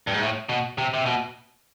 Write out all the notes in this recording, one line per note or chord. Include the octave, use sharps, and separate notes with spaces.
G2
G#2
A2
B2
C3
C3
B2